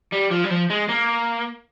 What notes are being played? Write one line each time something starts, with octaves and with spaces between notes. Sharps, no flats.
G3
F3
G3
F3
G#3
A#3